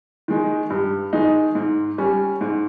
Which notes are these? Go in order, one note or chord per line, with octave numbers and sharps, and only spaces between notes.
D#3 G#3 D#4
G2
D#3 G#3 D#4
G#2
G3 C#4
G#2